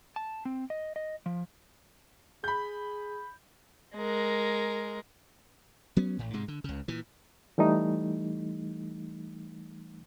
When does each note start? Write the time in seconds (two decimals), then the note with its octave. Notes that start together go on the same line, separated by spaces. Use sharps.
0.16 A5
0.45 C4
0.70 D#5
0.96 D#5
1.26 F3
2.44 G#4 B5 G6
3.95 G#3 A#4
5.97 F#3 B3 C#4
6.19 A1 A2
6.33 G#2 C3 G#3
6.48 D3
6.64 C#2 C#3
6.88 A#2 E3
7.58 E3 G3 A3 D#4